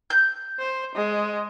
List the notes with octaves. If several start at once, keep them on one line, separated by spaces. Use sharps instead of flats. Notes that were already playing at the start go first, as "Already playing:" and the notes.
G6
C5
G#3